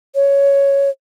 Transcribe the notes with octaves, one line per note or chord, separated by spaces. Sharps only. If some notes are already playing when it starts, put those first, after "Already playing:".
C#5